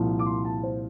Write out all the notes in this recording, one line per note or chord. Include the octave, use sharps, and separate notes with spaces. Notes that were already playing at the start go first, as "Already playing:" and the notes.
Already playing: C2 A#2 F3
D6
C6
A5
C5